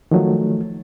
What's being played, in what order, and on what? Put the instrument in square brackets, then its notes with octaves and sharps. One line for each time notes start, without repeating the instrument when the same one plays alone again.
[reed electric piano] D#3 F3 F#3 A3